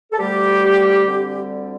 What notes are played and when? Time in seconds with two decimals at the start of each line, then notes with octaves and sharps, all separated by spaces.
0.12 A4
0.18 D2 D3 G3 A3 G4
1.06 D2 D3 G3 C4